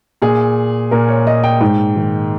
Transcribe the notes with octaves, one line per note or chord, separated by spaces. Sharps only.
A#2 G#4
A#2 A#4
C#5
D#5
G5
G#2 G5
D#3